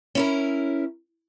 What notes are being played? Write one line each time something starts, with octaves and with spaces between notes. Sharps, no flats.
C#4 E4 A#4